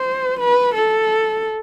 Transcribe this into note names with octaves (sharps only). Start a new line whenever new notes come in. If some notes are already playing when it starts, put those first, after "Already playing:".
Already playing: C5
B4
A4